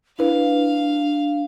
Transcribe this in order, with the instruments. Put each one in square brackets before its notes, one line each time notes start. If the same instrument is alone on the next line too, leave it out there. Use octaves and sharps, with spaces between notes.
[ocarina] D4 [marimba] E4 B4 [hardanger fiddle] F5